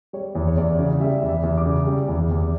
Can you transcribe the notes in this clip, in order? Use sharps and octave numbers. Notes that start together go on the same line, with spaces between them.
G3 C#5
E2
C#5
E2 D5
C#3
G3 E5
E2
E5
E2
D6
C#3
G3
E2
E2